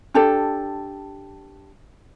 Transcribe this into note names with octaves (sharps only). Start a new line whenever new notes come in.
D4 G4 A4